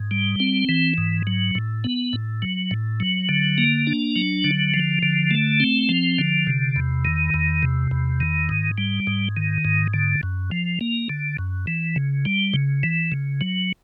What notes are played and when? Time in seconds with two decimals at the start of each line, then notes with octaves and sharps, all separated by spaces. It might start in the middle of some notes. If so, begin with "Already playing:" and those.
Already playing: G#2
0.11 G3
0.40 C4
0.69 E3
0.98 G#2
1.27 F#3
1.55 A2
1.84 B3
2.13 A2
2.42 F#3
2.71 A2
3.00 F#3
3.29 D3
3.58 A#3
3.87 D4
4.16 F#3
4.44 D3
4.74 F3
5.03 D3
5.31 A3
5.60 C4
5.89 F3
6.19 D3
6.47 C3
6.76 E2
7.05 D#3
7.34 E2
7.63 C3
7.91 E2
8.20 D#3
8.49 G#2
8.78 G3
9.07 G#2
9.37 D#3
9.65 G#2
9.94 D3
10.23 F#2
10.52 F3
10.81 A#3
11.09 D3
11.39 F#2
11.67 E3
11.96 C#3
12.25 G3
12.54 C#3
12.83 E3
13.12 C#3
13.41 F#3